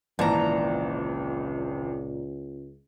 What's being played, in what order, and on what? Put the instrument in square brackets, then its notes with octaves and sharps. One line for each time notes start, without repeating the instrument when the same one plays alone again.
[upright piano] G#1 E3 A5 [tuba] C#2 [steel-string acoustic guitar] A#2 A#5